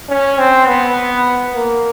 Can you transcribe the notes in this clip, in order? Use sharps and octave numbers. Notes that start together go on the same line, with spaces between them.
C#4
C4
B3
A#3